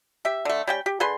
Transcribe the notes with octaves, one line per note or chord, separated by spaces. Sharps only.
G4 E5
D3 A3
G3 C#4 G5
G4
D3 G#4 B4 C6